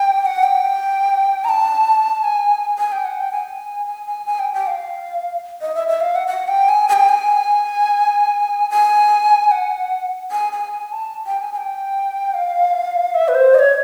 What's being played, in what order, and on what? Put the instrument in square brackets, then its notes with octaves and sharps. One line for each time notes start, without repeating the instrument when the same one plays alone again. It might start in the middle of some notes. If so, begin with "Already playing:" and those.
Already playing: [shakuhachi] G5
G5
F#5
G5
A#5
A5
G#5
G#5
G5
F#5
G5
G#5
G#5
G#5
G#5
G5
G5
F5
D#5
E5
E5
F5
F#5
F#5
G5
G#5
G#5
G5
G#5
G#5
F#5
G#5
G#5
G#5
A5
G5
G#5
G#5
G5
F5
E5
B4
C5
D#5
C#5